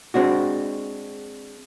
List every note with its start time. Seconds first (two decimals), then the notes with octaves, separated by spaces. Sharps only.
0.14 G#3 C4 D4 F#4